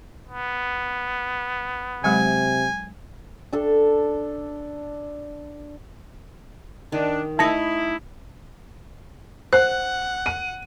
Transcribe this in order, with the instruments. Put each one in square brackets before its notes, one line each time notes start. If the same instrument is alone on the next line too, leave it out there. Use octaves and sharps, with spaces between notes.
[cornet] B3
[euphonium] C3 [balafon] F#3 G#3 [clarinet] G#5
[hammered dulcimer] D4 A4
[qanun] D#3 [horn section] D4
[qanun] A3 D#4 B5 [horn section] E4 [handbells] A5 A#6 C#7
[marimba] C5 [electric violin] F#5 [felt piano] F#6
[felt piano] D#7